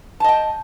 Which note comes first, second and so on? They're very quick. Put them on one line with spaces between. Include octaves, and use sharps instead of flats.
A5 D#5 G5